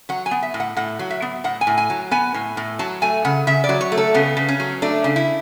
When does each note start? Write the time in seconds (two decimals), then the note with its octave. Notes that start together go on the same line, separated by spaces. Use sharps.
0.09 F#3 F#5
0.26 G#5
0.31 B3
0.42 E5
0.54 A2
0.60 F#5
0.77 A2 F#5
0.99 F#3
1.10 E5
1.22 B3
1.44 A2 F#5
1.61 G#5
1.67 A2
1.78 G#5
1.90 F#3
2.11 B3 G#5
2.34 A2
2.57 A2
2.79 F#3 A5
3.02 A3 G#5
3.25 C#3 F#5
3.47 C#3 E5
3.64 D5
3.69 F#3
3.81 C#5
3.92 A3
3.97 A4
4.14 C#3 B3
4.37 C#3
4.48 C#4
4.60 F#3
4.82 A3 D4
5.04 C#3
5.16 E4